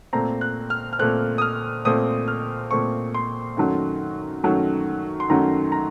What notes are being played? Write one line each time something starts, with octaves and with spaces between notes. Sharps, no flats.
A#2 A3 C4 A#5
F#6
F6
F6
A#2 A3 C4 F#6
D#6
F6
A#2 A3 C4 D#6
F6
A#2 A3 C4 C#6
C6
F#2 D#3 F#3 A3
F#2 D#3 F#3 A3
C6
F#2 D#3 F#3 A3 A#5
A#5